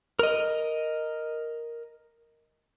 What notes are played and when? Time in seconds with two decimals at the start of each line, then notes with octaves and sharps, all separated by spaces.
0.19 A#4 D#5